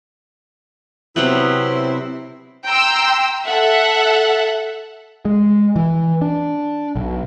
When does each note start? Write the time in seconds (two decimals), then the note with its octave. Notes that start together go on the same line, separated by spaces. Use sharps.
1.16 C3 F#3 B3 C4 E4
2.66 G5 A#5 C6 E6
3.47 A4 E5 F#5
5.25 G#3
5.76 E3
6.21 D4
6.96 B1